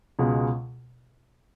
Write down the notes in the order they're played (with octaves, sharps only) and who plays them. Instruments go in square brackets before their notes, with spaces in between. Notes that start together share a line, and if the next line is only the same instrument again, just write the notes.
[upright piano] C#2 B2 G#3